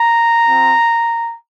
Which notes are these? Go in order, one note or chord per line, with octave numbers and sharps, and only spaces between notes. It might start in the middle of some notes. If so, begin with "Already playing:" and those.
Already playing: A#5
C4 F4